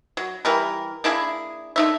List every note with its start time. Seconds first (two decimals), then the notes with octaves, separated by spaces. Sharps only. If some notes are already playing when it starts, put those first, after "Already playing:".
0.17 F#3
0.45 E3 G3 A#4
1.04 A#3 D4 E4 G#4
1.76 D3 D#4 E5